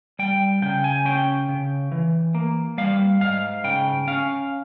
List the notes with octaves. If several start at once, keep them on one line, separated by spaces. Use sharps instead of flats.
G3 G5
C#3 G5
G#5
C#4 G5
C#3
E3
A#3
G3 F5
G#2 F5
C#3 G5
C#4 F5